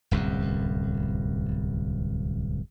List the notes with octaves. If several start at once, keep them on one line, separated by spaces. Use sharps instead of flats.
D1 C2 F#2